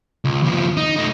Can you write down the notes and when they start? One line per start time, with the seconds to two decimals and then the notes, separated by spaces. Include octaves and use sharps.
0.25 C#2
0.42 D#2 F3
0.77 D#4
0.96 A3 D#4